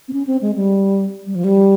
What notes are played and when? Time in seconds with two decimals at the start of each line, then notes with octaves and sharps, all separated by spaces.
0.08 C4
0.13 C#4
0.27 C4
0.42 G#3
0.55 G3
1.26 G3
1.35 F3
1.44 G3